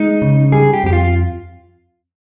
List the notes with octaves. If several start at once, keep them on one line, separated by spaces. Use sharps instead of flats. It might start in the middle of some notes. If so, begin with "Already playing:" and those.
Already playing: G#3 D#4
C#3
G3 G#4
G4
F2 G4
F4